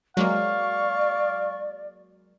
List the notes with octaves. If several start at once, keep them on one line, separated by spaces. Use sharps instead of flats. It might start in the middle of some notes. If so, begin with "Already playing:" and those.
F#3 G#3 A#3 D5 F5 C#6